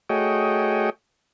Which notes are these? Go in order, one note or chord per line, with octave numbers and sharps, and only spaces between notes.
A3 F#4 G#4 C#5 D#5 G5